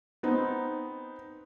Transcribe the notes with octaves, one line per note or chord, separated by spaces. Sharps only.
B3 C4 D#4